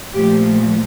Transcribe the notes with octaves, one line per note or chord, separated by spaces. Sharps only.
A#2 F3 A3 G4